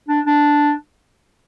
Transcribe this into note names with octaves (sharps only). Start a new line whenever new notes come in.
D4
D4